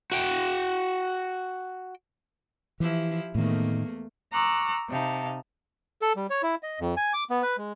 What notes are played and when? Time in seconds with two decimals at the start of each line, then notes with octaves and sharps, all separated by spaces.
0.12 F#4 G5
2.80 E3 F3 E4 G4
3.35 E2 A2 D#3 A3 A#3
4.32 A#5 C#6 D6 E6 F#6
4.89 C3 D#4 F5 A5
6.02 A4
6.16 G3
6.30 C#5
6.43 E4
6.63 D#5
6.80 F2
6.97 G#5
7.14 D6
7.30 B3
7.43 B4
7.58 G#3